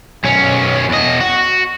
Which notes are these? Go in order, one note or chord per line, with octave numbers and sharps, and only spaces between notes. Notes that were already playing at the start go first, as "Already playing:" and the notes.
B1 C#4
E2 D#5
F#4